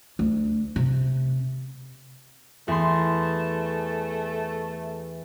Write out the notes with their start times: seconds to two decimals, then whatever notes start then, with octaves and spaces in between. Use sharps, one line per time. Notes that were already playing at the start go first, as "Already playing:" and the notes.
0.19 D2
0.76 C3
2.68 E2 A3 C6